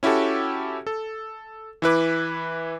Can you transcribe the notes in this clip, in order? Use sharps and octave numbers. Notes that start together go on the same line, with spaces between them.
C#4 E4 F#4 G4 A4
A4
E3 E4 B4 D6